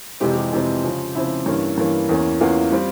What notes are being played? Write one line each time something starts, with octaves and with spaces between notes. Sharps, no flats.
F2 C3 E3 G#3 C4 G4
G4
F2 C3 E3 G#3 C4
C#3 F3 C4
C#3 F3 C4 E4
G2 E3 A#3 C#4
G2 E3 A#3 C#4
E2 E3 A#3 C#4
E2 E3 A#3 C#4 F4
G3 C4